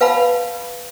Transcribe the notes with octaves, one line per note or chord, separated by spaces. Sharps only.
B4 F5 F#5 A5 B5